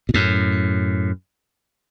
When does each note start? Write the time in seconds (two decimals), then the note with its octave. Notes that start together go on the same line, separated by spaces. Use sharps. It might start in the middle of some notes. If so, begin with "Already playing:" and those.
0.09 B2
0.14 F#2 A2